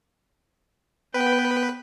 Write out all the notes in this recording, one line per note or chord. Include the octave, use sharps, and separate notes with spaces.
B3 B4 G5